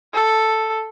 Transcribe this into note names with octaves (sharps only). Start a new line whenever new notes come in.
A4